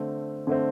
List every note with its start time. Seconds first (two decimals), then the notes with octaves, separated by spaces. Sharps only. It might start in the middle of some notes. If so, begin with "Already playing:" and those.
Already playing: D3 A3 C4
0.47 D3 A3 C4